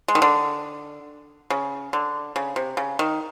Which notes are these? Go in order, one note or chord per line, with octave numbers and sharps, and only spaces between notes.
G#3
D#3
D3
C#3
D3
C#3
C3
C#3
D#3